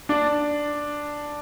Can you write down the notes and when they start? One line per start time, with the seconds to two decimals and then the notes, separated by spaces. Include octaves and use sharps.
0.09 D4